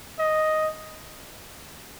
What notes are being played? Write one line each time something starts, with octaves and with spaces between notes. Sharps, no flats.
D#5